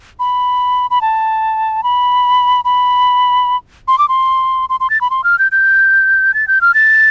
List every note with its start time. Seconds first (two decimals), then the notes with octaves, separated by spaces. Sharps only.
0.19 B5
0.91 B5
1.01 A5
1.84 B5
2.65 B5
3.88 C6
3.98 D6
4.09 C6
4.69 C6
4.80 C6
4.90 A6
5.01 B5
5.10 C6
5.24 F6
5.39 G6
5.52 G6
6.34 A6
6.48 G6
6.61 F6
6.74 A6